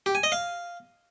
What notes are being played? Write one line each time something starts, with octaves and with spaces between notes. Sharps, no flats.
G4
G#5
D#5
F5